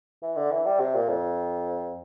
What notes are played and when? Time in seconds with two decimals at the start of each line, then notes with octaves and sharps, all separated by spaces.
0.22 E3
0.36 D3
0.51 E3
0.66 G3
0.80 C3
0.94 A#2
1.09 F2